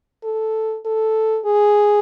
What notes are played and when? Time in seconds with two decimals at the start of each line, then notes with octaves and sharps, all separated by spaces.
0.24 A4
0.85 A4
1.46 G#4